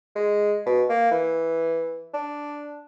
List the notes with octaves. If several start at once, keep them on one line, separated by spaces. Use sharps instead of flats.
G#3
B2
A#3
E3
D4